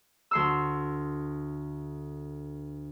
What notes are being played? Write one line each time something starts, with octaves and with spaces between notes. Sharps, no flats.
D2 C6 E6